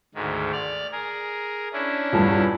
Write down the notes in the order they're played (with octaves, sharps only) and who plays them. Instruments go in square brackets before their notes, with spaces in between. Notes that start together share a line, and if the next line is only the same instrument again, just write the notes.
[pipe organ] D2 G#2 D#3
D5 F6
G#4 A#4
C#4 D4 E4
[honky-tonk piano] A#1 E2 G2